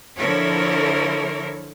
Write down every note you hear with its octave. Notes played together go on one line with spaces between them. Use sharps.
D3 F3 E4 A4 A#4 C#5